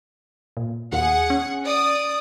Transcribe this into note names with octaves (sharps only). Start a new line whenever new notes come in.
A#2
D#2 G#4 F#5
C#4
D5 D#6